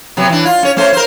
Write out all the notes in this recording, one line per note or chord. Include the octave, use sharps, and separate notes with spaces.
C3 F#3 B3
E3 D4
F4
C#4 C#5
A3 C#4 C5
A#4 C5